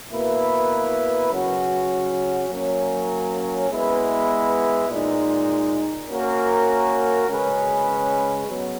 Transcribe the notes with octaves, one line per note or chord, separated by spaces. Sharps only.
B2 A#3 E4 B4
C#3 F#3 C#4 F#4
F#3 A#3 C#4
G#3 B3 E4 B4
A#2 G#3 D#4
A#3 C#4 F#4 A#4
C#3 G#3 C#4 G#4 B4
F#3 B3